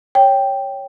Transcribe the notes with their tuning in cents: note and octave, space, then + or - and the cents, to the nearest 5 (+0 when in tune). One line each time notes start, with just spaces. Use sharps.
C#5 +0 G5 +0